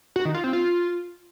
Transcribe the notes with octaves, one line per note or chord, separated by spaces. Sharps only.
F#4
D#3
F4
C4
F4